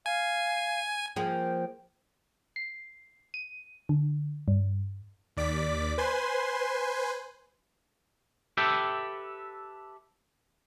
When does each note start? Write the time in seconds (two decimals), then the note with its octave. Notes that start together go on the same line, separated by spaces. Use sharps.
0.06 F5 G#5
1.16 F3 A#3 G#4 G5
2.56 C7
3.34 D#7
3.89 D3
4.48 G2
5.37 D#2 D5 D6 B6
5.98 B4 C5 G#5 C6
8.58 G4 A4 B4 E5 G5